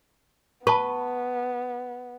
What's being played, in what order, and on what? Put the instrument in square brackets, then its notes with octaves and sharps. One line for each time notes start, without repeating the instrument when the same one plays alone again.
[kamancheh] B3 [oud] B4 [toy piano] A5 C#6